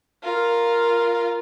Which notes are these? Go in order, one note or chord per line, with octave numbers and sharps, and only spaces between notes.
F4 A#4